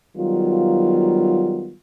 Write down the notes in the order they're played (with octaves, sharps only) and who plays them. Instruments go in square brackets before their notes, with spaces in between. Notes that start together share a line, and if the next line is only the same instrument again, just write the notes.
[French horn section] D#3 F#3 G3 B3 F4